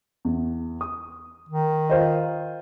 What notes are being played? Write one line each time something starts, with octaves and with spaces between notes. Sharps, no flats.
E2
D#6
D#3
F4 C5 D#5